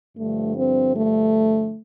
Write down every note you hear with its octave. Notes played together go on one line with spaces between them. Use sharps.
G2 D3 F3 A3
C4
A3